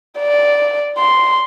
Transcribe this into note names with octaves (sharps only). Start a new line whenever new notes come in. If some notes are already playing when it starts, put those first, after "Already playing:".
D5
C6